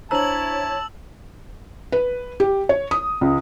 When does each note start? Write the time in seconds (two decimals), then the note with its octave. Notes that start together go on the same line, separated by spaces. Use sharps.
0.11 D4 E4 C5 C#5 A5 A#5 E6 F#7
1.92 B4
2.40 G4
2.69 C#5
2.91 D#6
3.21 C#2